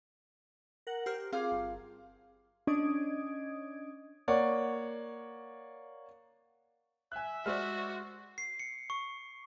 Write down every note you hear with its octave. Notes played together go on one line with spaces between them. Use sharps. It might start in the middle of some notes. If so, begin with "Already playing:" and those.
A#4 F#5
G4 A#4 C5
C4 F4 G#4 D6 F6
G1
C#4 D4 D#5 D#6 G#6 D7
A#3 C#5 D5 F#5
E5 G#5 F#6
G#3 F#4 C5 D5 F6
C7
C#7
C#6